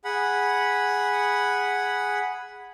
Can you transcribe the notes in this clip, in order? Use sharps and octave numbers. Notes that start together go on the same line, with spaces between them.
G#4 F#5 B5